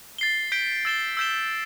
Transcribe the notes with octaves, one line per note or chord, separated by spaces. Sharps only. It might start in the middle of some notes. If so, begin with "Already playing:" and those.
A6 C7 G7
G6 B6 D7 G7
E6 A6 E7 G7
E6 G6 B6 E7 G7